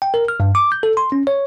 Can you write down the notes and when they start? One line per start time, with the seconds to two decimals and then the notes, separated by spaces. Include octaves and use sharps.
0.02 G5
0.14 A#4
0.28 F6
0.40 G2
0.55 D6
0.72 G6
0.83 A4
0.97 C6
1.12 C#4
1.27 C#5